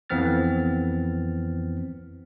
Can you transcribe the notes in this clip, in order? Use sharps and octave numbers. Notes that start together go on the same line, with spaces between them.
F2 E3 B3 C4 F6 A6